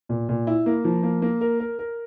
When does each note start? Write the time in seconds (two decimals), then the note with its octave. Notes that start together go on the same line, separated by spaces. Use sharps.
0.09 A#2
0.29 A#2
0.47 E4
0.66 A#3
0.85 F3
1.03 A#3
1.22 A#3
1.41 A#4
1.60 A#4
1.79 A#4